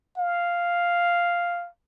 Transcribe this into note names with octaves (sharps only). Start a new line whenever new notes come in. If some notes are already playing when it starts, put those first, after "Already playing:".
F5